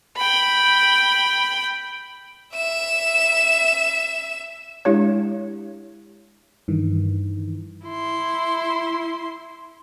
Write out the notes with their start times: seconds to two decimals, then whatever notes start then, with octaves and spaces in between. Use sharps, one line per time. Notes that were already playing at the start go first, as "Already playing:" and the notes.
0.17 G5 B5
2.54 E5 E7
4.85 G#3 D4 E4 G4 C#5
6.68 G2 D#3 E3
7.86 E4 C6